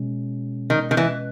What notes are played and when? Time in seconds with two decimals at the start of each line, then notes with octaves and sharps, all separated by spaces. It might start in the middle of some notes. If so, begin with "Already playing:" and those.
Already playing: B2 G#3 C#4
0.70 D#3
0.91 D#3
0.97 E3